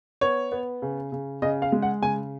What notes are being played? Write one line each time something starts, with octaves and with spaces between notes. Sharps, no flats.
B3 C#5
B3
C#3
C#3
C#3 D#5
F5
G#3
F#5
C#3 G#5